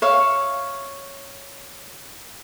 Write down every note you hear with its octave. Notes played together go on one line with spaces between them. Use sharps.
C#5 E5 F5 C#6